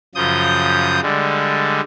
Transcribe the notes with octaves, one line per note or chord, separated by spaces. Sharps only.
F#2 C#3 F3 D#6 G6
D3 G3 G#3